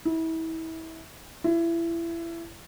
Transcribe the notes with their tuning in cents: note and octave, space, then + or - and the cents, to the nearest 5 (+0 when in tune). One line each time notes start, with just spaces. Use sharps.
E4 -30
E4 +25